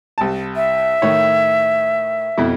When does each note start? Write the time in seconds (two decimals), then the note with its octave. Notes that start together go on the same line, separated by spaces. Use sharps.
0.18 C2 A5
0.56 E5
1.02 A2 D#3 C#5
2.38 F2 B2 E4